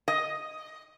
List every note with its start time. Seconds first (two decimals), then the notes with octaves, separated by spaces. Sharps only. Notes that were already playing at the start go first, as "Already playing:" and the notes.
0.08 D#5